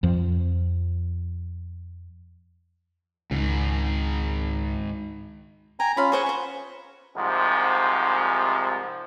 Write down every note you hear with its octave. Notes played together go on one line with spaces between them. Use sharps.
F2 F3
C#2 G#2 D#3
G5 G#5 A#5
C#4 F4 F5 B5
G#4 C5 F#5 C#6
C5 F#5
C2 G#2 C3 F3